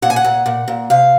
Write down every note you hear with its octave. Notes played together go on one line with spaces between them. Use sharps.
A#2 F#5
G#5
F#5
A#2
A#2
A#2
C3 F5